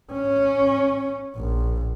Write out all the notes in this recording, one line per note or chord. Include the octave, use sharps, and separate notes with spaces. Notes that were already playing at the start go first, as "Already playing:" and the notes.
C#4
A#1